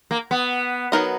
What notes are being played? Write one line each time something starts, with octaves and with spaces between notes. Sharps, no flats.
A#3
B3
F#3 B3 D#4 A#4 D#5